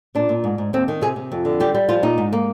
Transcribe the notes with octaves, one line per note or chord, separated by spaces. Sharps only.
A#2 D4
A#2
G#2
G#2
D#2 C4
D#3
C3 G#4
C3
F2
D3
G3 G4
G3
F3 F4
A#2 D#4
G#2
A#3